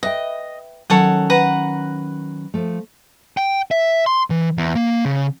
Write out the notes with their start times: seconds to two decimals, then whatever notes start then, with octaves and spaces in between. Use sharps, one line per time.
0.03 B4 D#5 E5 G5
0.90 D#3 F#3 C#4 A4 C#5 F#5
1.30 B4 F#5 A#5
2.54 F3 A3
3.37 G5
3.71 E5
4.06 C6
4.30 E3
4.58 E2
4.75 A#3
5.05 C#3